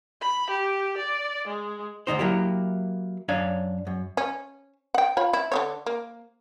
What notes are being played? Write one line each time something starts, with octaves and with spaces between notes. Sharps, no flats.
B5
G4
D5
G#3
D2 B2 D#4 C5
F#3 A#3 E4 G4
F#2 D4 C#5 F5
F#2
C#4
F#5 G5
F4 C#5 B5
E4
D3 D#3 C#5
A#3